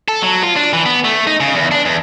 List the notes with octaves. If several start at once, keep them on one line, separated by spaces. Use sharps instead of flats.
A4
F#3
F4
D4
E3
B3
A3
D#4
C#3
E2
D4
E2